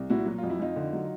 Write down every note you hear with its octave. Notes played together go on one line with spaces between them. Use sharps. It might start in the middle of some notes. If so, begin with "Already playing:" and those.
Already playing: C2
A#2 E4 F#4
F#3 F#4
F4
F2
E4
F2 D#4 F4
D3
F#3